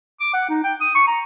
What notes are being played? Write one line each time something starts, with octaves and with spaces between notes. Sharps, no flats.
D6
F#5
D#4
G5
D#6
C#6
A#5